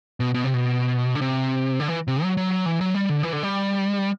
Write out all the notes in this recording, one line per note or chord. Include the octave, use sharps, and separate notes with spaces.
B2
B2
C3
B2
D3
C3
D3
E3
C3
F#3
F#3
E3
F#3
G3
D3
E3
D3
G3